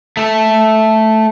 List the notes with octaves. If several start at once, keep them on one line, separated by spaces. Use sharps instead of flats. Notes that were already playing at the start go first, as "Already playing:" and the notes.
A3 A4